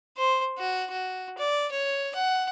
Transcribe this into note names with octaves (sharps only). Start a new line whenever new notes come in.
C5
F#4
F#4
D5
C#5
F#5